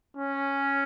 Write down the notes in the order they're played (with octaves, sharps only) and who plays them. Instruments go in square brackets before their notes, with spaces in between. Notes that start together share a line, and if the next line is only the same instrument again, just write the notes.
[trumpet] C#4